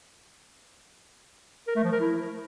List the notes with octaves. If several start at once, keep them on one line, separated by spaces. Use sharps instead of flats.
A#4
A3
F3
A#4
E4